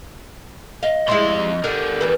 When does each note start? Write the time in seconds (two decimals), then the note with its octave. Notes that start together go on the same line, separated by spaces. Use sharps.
0.83 D#5 F5
1.08 F2 G3 G#3 E4 C6
1.64 D3 G3 A#4
2.01 E2 E3 B4